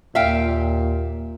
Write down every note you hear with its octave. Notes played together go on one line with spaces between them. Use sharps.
D#2 A#2 E5 F5 G5